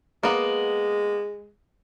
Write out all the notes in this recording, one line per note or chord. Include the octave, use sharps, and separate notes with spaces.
G#3 A#3 B3